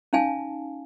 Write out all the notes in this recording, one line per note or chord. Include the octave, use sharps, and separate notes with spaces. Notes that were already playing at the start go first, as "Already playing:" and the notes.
C#4 D#4 F5 G#5 A5